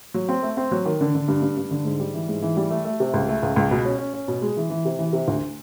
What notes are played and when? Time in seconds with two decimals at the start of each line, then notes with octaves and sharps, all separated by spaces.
0.14 F#3
0.29 C4
0.43 A3
0.57 C4
0.71 F#3
0.86 D#3
1.01 D3
1.15 D3
1.28 G2
1.42 G2
1.57 G2
1.71 D3
1.85 G#2
2.00 G3
2.14 E3
2.29 G#2
2.42 E3
2.57 G3
2.70 A3
2.85 A3
3.00 C3
3.14 C#2
3.29 A3
3.43 C#2
3.56 C#2
3.71 B2
3.85 C#4
3.99 C#4
4.14 C#4
4.28 B2
4.42 G#3
4.57 E3
4.70 E3
4.85 C3
4.99 E3
5.13 C3
5.28 D2